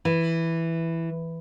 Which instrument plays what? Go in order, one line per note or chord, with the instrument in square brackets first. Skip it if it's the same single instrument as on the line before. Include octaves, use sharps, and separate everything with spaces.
[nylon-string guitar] E3